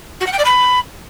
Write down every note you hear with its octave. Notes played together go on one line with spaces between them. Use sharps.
F#4
F#5
G5
D5
B5